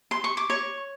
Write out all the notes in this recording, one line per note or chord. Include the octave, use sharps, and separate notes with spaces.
C6
C#6
D6
C#5 C#6